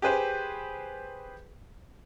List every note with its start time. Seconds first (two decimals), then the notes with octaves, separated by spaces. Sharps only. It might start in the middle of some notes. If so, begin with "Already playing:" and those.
0.02 G4 G#4 B4 C5